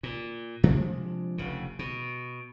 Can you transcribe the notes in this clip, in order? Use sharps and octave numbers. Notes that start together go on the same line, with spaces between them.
A#2
C3 F3 G#3 D4
F1 C#3
B2